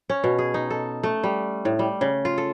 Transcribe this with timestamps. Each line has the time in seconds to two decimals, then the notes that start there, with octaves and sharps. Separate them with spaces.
0.09 C#4
0.24 B2
0.38 G#4
0.54 D#4
0.70 A4
1.03 A3
1.23 G3
1.65 A2
1.79 G3
2.01 C#3
2.25 F4
2.38 A4